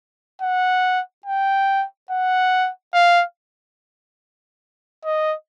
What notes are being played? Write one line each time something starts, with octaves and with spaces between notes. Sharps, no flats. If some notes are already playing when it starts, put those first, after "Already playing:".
F#5
G5
F#5
F5
D#5